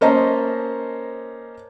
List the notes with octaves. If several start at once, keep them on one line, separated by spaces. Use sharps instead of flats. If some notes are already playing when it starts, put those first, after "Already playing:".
A#3 C#4 C5 D#5 A5 A#5